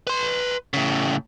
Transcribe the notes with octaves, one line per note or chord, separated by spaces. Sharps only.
B4 C6
A2 C#3